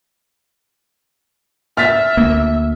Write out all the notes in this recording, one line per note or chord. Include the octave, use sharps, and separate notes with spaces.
E5 F6 A6 B6
D2 A#3